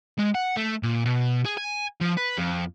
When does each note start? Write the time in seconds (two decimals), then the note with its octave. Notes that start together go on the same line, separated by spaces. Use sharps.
0.19 G#3
0.35 F#5
0.57 A3
0.83 A#2
1.05 B2
1.45 G#4
1.57 G#5
2.01 F3
2.17 B4
2.38 F2